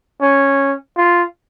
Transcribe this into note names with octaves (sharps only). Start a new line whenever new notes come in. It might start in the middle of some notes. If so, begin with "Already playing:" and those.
C#4
F4